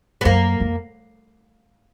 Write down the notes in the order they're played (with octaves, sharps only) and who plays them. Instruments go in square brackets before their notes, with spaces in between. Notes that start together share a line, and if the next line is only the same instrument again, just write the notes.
[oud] B3
[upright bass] F#2 [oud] A#3
[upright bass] F2